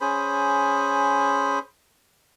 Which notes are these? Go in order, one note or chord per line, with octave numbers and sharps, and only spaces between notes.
C#4 G#4 C5 B5